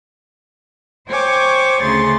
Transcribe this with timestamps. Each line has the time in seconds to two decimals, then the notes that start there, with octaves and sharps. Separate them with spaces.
1.08 C5 C#5 G5 G#5 C#6 D6
1.82 D2 C#3 G#4 C6 A6